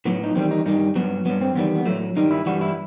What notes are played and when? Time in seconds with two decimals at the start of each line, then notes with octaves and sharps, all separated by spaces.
0.05 A2 F#3 B3
0.24 D#4
0.35 E2 D#3 G3 C4
0.51 D#4
0.66 G2 D#3 G3 D#4
0.96 G2 F#3 B3
1.25 G2 F#3 B3
1.41 C4
1.55 E2 D#3 G3 B3
1.76 B3
1.86 A2 F#3 A3
2.16 G2 D#3 G3 D#4
2.31 E4
2.46 G2 E3 G3 F#4
2.61 E4